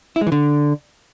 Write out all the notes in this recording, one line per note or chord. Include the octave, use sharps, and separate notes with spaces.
E4
G#3
E3
D3